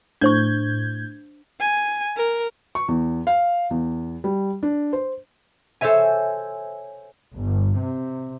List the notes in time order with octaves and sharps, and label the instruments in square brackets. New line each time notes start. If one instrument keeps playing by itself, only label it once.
[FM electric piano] A2 G6 G#6 [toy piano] D4 C5 C#6
[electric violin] G#5
A#4
[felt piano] C#6
E2
F5
E2
G3
D4
C5
[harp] A4 C5 C#5 E5 G#5
[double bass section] G1
C3